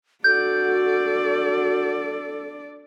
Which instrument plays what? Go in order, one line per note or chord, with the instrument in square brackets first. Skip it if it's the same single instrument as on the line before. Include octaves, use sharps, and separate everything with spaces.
[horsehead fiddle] D4 D5 [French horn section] F#4 [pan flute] A4 [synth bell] G6